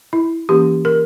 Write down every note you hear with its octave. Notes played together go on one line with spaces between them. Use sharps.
E4
E3 A#3 C#4 G4
A#4